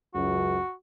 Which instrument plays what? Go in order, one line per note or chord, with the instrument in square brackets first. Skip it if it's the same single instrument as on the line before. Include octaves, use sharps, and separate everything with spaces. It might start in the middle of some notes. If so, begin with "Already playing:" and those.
[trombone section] C#2 F#2 [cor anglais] F#4